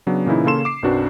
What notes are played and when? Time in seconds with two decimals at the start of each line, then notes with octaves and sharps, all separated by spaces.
0.07 C#3 F#3 B3 D4
0.26 A#2 C#3 E3 D#4 E4
0.45 C#3 A#3 C#4 A4 C6 E7
0.65 D6 C7
0.83 B1 F#2 C4 D4 F#4 B4